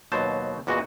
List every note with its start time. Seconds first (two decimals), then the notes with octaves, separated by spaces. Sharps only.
0.12 D#2 B2 F#3 C5 A5
0.67 E2 A#2 F#4 D#5